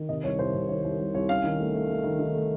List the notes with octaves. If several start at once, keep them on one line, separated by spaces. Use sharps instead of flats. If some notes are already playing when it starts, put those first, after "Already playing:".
Already playing: D#3
C3 D#5
C2 C#5
C2 C5
C3
D#3 C#5
C2
C2
C2 C#5
C#4 F5
D#3
A3
A3
A3
D#3
D#3
A3